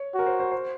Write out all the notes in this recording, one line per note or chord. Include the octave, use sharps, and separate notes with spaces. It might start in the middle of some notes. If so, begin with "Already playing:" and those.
Already playing: C#5
F#4 A#4
C5
C5
C5